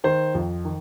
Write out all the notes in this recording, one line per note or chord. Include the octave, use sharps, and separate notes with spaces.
D#3 C5
F2
D#3